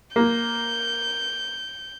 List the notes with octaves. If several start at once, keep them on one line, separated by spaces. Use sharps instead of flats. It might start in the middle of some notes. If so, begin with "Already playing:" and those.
A#3 G6